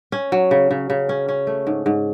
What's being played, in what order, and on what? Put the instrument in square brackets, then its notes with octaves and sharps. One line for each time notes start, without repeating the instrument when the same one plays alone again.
[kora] C#4
F#3
C#3
C#3
C#3
C#4
C#4
A3
G#2
G#2